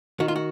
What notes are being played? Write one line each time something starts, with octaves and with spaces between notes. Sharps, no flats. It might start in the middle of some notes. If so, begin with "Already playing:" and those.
D#3 F#4
F4
F#4